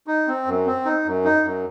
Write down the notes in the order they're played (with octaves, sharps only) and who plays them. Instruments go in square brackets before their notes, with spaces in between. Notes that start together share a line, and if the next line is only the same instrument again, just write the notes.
[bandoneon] D#4
C4
F#2
C4
D#4
F#2
D#4
F#2